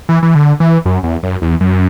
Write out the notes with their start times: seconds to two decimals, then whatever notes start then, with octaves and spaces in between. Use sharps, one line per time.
0.09 E3
0.23 E3
0.35 D3
0.60 E3
0.86 F#2
1.03 E2
1.23 F#2
1.42 E2
1.61 F#2